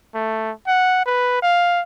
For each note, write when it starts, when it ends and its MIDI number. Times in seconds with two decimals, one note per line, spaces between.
0.14 0.51 57
0.67 1.05 78
1.06 1.38 71
1.42 1.82 77